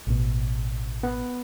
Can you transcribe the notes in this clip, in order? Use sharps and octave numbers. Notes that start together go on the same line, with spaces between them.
A1 B2
B3